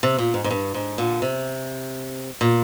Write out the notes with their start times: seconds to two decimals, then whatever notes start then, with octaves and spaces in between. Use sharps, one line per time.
0.03 C3
0.18 A#2
0.34 G#2
0.44 G#2
0.51 G2
0.74 G#2
0.98 A#2 D3
1.22 C3
2.41 A#2